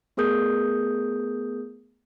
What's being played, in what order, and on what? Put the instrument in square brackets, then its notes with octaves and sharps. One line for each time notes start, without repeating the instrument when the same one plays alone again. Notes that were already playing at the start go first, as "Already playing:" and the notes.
[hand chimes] A3 B3 G#4 A#4 D#6 G6